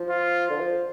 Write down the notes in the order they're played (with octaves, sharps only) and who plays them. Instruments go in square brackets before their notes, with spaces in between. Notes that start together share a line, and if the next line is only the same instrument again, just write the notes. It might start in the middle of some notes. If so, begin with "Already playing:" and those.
Already playing: [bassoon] F3
[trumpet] F4
[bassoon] D3
F3